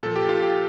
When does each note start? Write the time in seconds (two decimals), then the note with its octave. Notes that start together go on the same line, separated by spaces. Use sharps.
0.03 A#2 F3 A4
0.16 G4
0.29 F4
0.42 G4